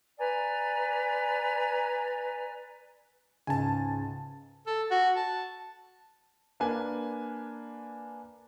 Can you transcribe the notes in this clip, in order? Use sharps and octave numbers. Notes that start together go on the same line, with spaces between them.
B4 D5 G#5 A#5
C#2 G#2 C#3 G#5 A5
A4
F#4
A5
A#3 D4 B4 G#5